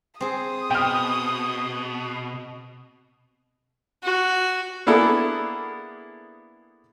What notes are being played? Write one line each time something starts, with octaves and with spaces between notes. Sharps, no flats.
C4 G#4 D#6
B2 G5 F6
F#4
A#3 B3 D4 E4 G#4 A4